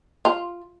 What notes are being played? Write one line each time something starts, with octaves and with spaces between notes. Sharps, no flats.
F4